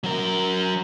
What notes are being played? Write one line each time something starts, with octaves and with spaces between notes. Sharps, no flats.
F#3 A#4